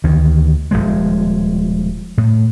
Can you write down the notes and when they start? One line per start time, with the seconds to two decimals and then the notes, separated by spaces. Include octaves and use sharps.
0.04 D2 D#3 E3
0.71 D#1 B1 F3 G#3
2.18 A2